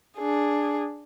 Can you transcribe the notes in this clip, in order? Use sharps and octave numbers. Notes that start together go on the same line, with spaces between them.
D4 G#4